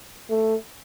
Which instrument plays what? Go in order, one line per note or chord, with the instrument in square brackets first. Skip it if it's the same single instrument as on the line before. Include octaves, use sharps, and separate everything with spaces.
[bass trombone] A3